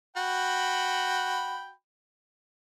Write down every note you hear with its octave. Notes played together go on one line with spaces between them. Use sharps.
F#4 G5 B5